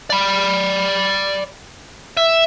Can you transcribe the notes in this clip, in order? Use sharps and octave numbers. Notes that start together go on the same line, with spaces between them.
D5 B5
E5